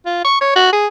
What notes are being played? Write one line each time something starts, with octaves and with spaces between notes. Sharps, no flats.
F4
C#6
C#5
F#4
G#4